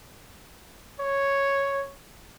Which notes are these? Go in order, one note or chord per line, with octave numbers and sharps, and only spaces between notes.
C#5